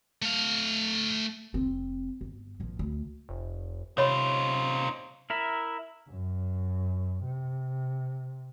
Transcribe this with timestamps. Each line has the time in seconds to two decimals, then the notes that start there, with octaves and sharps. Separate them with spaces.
0.22 A3 F5
1.54 F1 C4
2.21 G1
2.60 A#1 F3
2.79 D2
3.29 F1
3.98 C3 D#4 F4 C#5 D#5 B5
5.30 E4 A#4 E5
6.09 F#2
7.24 C3